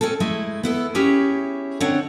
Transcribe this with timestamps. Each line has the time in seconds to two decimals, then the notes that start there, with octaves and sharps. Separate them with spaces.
0.01 G#3 C4 C#4 A4
0.20 G#3 A3 E4
0.63 B3 E4 A4
0.95 C#4 E4 G4 G#4 C#5
1.80 D3 C4 D4 D#4 C#5 F#5